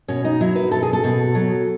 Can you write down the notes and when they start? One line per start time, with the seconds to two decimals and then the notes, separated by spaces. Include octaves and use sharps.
0.08 B2 C#4
0.25 D#4
0.41 F#3 E4
0.56 B4
0.71 B2 A4
0.83 G#4
0.93 A4
1.04 B2
1.35 F#3